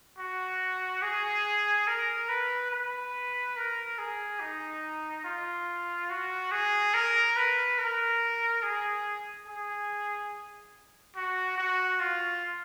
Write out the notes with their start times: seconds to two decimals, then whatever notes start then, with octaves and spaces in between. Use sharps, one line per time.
0.18 F#4
1.02 G#4
1.87 A#4
2.29 B4
2.71 B4
3.57 A#4
3.99 G#4
4.40 D#4
5.24 F4
6.10 F#4
6.52 G#4
6.94 A#4
7.36 B4
7.78 A#4
8.62 G#4
9.47 G#4
11.16 F#4
11.57 F#4
12.00 F4